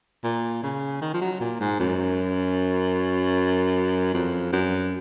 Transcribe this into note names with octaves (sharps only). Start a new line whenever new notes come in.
A#2
C#3
D#3
F3
F#3
A#2
G#2
F#2
F2
F#2